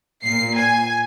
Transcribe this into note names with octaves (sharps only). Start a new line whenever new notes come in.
A#2 C7
G#5